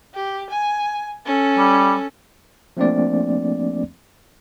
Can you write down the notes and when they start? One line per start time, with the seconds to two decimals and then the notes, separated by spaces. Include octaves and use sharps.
0.14 G4
0.50 G#5
1.26 C#4 A4
1.58 G3
2.77 F3 A3 A#3 C4 D4 D5